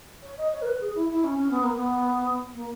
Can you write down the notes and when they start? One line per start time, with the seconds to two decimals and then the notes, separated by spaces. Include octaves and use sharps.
0.22 C#5
0.37 D#5
0.52 C#5
0.62 A#4
0.66 B4
0.80 G#4
0.95 E4
1.10 E4
1.24 C#4
1.38 C#4
1.51 B3
1.63 A#3
1.75 B3
2.54 A#3